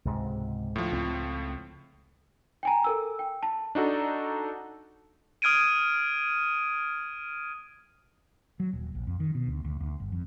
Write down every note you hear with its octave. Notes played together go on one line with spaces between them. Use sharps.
C#2 G#2 C3
D2 A2 F3
C#2 C4
G5 G#5 A#5
A4 A#4 E6
G5
A5
D4 D#4 F#4 A4
D#6 F6 G#6 D7 D#7
F#3
D#1
A#1
F2
D#3
B2
D2
D2
D2
G1
F2